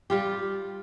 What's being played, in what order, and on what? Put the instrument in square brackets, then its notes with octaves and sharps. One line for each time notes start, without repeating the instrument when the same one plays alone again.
[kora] G3 F4 G4